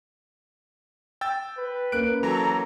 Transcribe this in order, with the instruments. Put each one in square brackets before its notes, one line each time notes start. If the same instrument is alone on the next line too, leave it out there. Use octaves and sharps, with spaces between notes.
[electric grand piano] G5 E6 A6
[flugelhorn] B4
[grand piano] A#3 C#4 [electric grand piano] F#6 D7
[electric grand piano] E3 F#3 [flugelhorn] A4 [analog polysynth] A#5